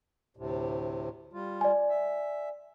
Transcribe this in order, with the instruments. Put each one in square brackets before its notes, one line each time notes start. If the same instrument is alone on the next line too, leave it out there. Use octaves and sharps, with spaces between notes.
[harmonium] D2 A2 C3
G3 F4
[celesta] D5 G#5
[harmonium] E5